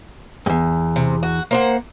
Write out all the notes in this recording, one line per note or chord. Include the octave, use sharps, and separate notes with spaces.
E2 G2
C3
F#4
A#3 C5 F#5